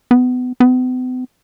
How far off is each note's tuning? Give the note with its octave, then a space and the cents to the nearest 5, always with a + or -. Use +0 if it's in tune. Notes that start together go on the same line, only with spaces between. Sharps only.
B3 +25
B3 +45